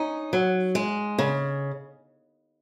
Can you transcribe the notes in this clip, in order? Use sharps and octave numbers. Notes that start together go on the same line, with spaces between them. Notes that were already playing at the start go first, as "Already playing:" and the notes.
Already playing: C#4 D#4
F#3
G#3
C#3